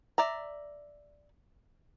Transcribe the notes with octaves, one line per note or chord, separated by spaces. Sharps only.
D5 E5 A#5